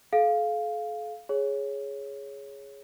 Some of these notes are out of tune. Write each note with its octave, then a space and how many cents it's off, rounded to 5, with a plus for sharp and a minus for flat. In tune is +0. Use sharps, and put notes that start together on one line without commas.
A4 -45 F5 +0
G#4 +0 C#5 +0